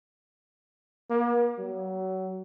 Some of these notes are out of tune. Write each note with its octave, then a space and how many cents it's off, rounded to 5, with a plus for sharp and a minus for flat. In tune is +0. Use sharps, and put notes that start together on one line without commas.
A#3 +45
F#3 +25